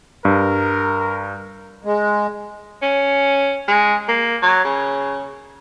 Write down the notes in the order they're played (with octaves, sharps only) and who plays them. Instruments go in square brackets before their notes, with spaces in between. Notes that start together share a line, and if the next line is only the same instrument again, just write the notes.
[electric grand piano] G2 [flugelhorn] A#4
[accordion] G#3
[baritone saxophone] C#4
G#3
A#3
F#3
C#3